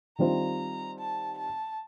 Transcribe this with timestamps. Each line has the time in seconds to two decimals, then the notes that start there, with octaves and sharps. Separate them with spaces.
0.19 D#3 G3 C4 F4 C5 A#5
0.99 A5
1.38 A5